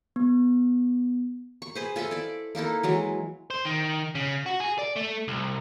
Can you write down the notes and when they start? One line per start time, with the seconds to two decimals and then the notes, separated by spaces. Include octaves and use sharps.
0.16 B3
1.62 C#6
1.75 G#4 B4 C5
1.96 F4 A4 D#5 E5
2.11 E4 D5
2.55 A#3 D#4 E4 A4
2.83 E3 F#3 G#3
3.50 C5
3.65 D#3
4.15 C#3
4.46 F#4
4.60 G#4
4.79 D5
4.96 A3
5.28 C2